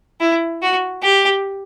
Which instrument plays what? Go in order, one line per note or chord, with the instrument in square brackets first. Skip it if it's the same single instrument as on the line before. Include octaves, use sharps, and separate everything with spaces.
[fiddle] E4
F#4
G4